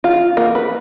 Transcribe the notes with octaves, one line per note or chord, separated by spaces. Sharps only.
F4
A#3
B4